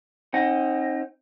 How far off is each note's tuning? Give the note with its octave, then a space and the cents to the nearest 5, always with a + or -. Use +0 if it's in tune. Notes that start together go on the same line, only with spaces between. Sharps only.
C4 +35 D#4 +0 F#5 +0